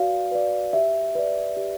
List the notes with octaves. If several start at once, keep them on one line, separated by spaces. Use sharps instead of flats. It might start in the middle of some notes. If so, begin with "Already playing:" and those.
Already playing: F#4 B4 D5 F5
B4 D5
G4 E5
B4 D5
G4